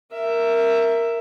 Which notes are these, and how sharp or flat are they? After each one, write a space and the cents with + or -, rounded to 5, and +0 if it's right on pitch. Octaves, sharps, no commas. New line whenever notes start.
A#4 +0 E5 +10